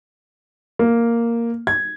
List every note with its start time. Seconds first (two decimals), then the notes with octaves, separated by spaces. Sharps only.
0.79 A#3
1.67 G#6